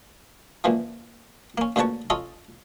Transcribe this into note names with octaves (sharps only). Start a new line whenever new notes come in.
C#2 A#2 E3 F3
A#3 C#4
D2 A#2 C#3 B4 A5 C#6
C#4 F4 A4 D#5